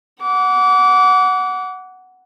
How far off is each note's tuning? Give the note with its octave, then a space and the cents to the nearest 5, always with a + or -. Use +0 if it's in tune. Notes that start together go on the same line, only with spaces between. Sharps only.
F#5 +0 D6 -30